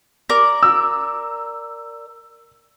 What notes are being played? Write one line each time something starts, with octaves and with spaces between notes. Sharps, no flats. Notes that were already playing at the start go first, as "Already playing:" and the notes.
A#4 D5
E6